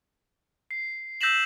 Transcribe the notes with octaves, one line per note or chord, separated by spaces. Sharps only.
C7
E6 G6 A#6 B6 E7 F#7